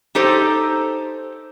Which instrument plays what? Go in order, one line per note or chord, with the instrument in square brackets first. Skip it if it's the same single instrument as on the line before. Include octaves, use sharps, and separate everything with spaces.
[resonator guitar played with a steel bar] D#4 G4 A4 C5